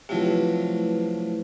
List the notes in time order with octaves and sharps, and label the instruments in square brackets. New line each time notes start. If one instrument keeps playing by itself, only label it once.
[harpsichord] C3 F3 F#3 [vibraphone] A3 E4 B4